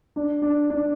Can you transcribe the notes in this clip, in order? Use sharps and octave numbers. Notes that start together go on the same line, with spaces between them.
D4
D4
D4